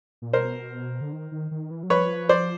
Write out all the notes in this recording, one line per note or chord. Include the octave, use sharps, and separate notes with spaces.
A#2
B2 A#4 C5
D3
D#3
D#3
D#3
E3
F#3
F3 B4 C#5
C5 D5